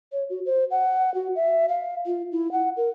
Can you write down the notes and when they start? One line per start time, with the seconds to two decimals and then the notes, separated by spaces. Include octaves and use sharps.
0.12 C#5
0.30 F#4
0.46 C5
0.71 F#5
1.14 F#4
1.36 E5
1.69 F5
2.06 F4
2.32 E4
2.52 F#5
2.77 A#4